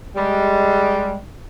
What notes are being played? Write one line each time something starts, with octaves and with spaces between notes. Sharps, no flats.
G3 G#3